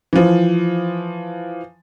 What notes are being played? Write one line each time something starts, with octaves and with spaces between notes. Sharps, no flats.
E3 F3